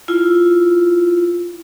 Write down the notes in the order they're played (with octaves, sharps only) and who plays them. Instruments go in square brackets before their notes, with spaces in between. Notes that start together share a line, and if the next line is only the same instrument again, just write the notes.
[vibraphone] E4 F4